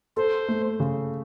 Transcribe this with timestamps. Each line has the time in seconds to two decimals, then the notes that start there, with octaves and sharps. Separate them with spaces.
0.17 A4 C5
0.48 A3
0.80 C#3